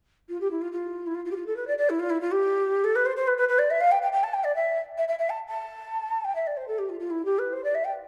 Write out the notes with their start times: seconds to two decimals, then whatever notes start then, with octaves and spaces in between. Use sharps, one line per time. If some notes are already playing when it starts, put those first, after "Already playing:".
0.29 F4
0.40 G4
0.50 E4
0.61 F4
0.72 F4
1.06 E4
1.14 F4
1.25 F4
1.31 G4
1.36 F4
1.46 A4
1.56 B4
1.67 D5
1.78 D5
1.89 E4
1.99 F4
2.09 E4
2.20 F4
2.31 G4
2.84 A4
2.95 B4
3.05 C5
3.16 C5
3.27 B4
3.37 B4
3.48 B4
3.58 D5
3.70 E5
3.80 F5
3.91 G5
4.02 G5
4.12 G5
4.23 A5
4.33 G5
4.43 D5
4.55 E5
4.97 E5
5.08 E5
5.18 E5
5.29 A5
5.48 A5
6.24 G5
6.35 E5
6.46 D5
6.56 C5
6.67 A4
6.78 G4
6.89 F4
6.99 F4
7.10 E4
7.25 G4
7.38 B4
7.52 C5
7.63 D5
7.74 E5
7.84 G5